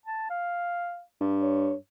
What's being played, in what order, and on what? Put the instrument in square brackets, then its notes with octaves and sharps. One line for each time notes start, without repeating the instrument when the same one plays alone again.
[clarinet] A5
F5
[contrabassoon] G2
[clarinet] C#5